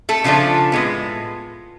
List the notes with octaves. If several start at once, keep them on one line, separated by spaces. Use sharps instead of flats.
A3 A4
C#3 F3 A3 D4 F4
A2 G#3 B3